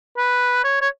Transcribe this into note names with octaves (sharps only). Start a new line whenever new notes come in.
B4
C#5
C#5